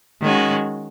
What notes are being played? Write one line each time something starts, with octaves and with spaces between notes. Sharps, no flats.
D#3 G#3 C#4 F#4